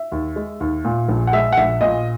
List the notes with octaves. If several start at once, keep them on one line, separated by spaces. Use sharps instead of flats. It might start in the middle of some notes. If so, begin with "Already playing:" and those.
Already playing: E5
D#2
G#3
D#2
A#2
A#1
F#5
G#3 E5
F#5
A#1 E5
A#2 D#5